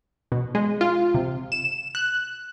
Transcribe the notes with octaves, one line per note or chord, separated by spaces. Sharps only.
B2
G#3
F4
C3
E7
F#6